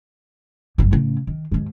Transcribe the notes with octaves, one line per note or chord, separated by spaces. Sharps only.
G1 F#2
A2 C#3
D#3
D#2 G#2